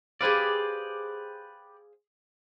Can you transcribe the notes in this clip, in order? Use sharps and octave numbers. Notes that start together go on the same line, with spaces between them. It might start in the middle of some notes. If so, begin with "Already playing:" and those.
G4 G#4 B4 C5 D5 F5